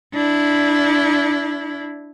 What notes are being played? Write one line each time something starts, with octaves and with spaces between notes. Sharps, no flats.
D4 E4